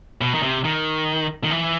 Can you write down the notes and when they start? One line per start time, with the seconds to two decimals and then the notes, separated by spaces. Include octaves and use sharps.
0.21 B2
0.34 D#3
0.43 C3
0.65 D#3
1.44 D#3
1.51 E3